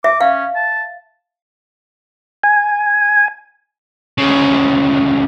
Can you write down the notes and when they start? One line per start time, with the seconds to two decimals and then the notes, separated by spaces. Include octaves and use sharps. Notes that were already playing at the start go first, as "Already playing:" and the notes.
0.04 E5 D6
0.21 C#4 F5
0.56 A5
2.43 G#5
4.18 D2 C#3